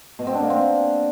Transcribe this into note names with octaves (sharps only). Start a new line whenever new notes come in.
B2
C4
D4
A#3
C4